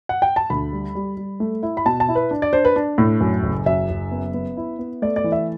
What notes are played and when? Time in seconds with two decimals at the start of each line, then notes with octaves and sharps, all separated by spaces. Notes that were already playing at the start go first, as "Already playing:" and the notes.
0.09 F#5
0.22 G5
0.36 A5
0.50 D2 B5
0.73 G3
0.95 G3
1.17 G3
1.40 A3
1.63 E4
1.77 B5
1.86 B2 A5
2.00 A5
2.08 E4
2.15 B4
2.31 D4
2.42 D5
2.53 D4 C5
2.65 B4
2.76 D4
2.98 A2
3.21 F#2
3.43 F#1
3.66 F#2 E5
3.89 F#1
4.11 B3
4.34 B3
4.57 E4
4.79 B3
5.02 A3 D5
5.16 D5
5.24 E3
5.32 E5